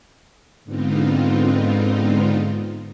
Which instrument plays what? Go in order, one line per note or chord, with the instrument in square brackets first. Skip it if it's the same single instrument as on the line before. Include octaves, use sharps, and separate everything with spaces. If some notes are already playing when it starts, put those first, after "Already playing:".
[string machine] G#2 D3 B3 C4 D#4 F4